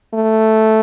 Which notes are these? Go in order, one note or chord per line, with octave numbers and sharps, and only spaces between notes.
A3